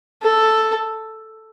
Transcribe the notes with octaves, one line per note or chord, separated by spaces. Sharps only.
A4